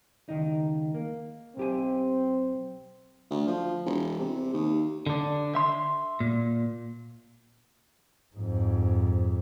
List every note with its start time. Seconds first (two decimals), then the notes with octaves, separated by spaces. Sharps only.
0.29 C#2 D#3 D#4
0.94 A#3
1.57 B1 C4 G4 G#5
3.30 D2
3.48 F3
3.86 E1
4.19 C3
4.54 D#2
5.06 D3 D4
5.55 E5 C6
6.20 A#2
8.36 F2 G#2